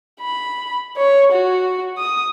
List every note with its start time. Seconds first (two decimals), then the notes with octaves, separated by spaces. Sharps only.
0.20 B5
0.97 C#5
1.32 F#4
1.98 D#6